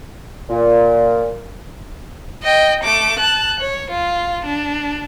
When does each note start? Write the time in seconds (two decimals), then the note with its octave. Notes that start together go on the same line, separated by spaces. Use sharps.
0.50 A#2
2.43 D#5 G5
2.83 A3 D6
3.19 A5 F#6
3.60 C#5
3.91 F4
4.46 D4